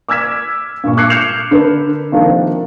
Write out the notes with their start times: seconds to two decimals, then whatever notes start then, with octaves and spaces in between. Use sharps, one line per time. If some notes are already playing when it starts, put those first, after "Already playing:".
0.09 D6 E6 F6 G#6 B6 E7
0.84 G2 A#2 C#6
0.97 D6 F#6 G#6 C7 C#7
1.10 F6 G6 C7 C#7 E7 F7
1.51 D3 D4 A#4 B4
2.12 C3 D#3 F3 A#3 D4 A4